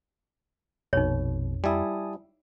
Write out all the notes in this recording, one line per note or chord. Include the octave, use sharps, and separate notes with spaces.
A#1 F2 B2 D#4 C#5
G3 E4 G#5 A5 D#6